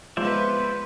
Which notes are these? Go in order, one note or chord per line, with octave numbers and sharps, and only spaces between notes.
F3 G#3 B3 F4 B4 C5 D5 E5